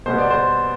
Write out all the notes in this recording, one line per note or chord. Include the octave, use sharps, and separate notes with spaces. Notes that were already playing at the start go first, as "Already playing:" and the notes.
B2 G3 B3 C5
D5
C5